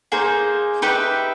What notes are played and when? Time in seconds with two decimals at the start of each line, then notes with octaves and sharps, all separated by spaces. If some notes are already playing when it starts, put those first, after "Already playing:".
0.12 A#3 D#4 G#4 C5
0.82 D#4 G4 B4 E5